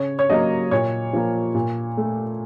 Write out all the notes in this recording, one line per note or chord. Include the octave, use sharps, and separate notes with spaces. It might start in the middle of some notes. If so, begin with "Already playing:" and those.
Already playing: C#3 C#5
C#5
F#3 A#3 D#5
A#2 C#5
F3 A#3
A#2
A3